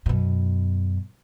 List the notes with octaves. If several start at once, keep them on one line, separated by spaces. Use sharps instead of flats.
F#2 B2